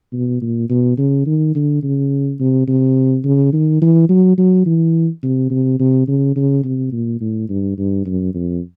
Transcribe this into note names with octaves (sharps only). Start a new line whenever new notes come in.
B2
A#2
B2
C#3
D#3
D3
C#3
C3
C3
C#3
D#3
E3
F#3
F#3
E3
C3
C3
C3
C#3
C#3
C3
A#2
A2
G2
G2
F#2
F2